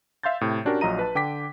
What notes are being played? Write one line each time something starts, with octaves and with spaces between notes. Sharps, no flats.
E5 F5 C6 G6 A6
A2 C3
C#4 D4 F#4 G4 A#4
A#1 F#3 F4 D#5 A#5 D#7
B4 A5
D3 G5 D6 B6